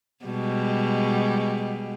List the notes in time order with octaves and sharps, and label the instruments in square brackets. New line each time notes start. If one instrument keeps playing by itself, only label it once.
[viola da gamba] B2 G3 G#3